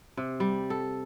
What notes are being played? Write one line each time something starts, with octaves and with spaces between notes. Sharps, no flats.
C3
G3
A4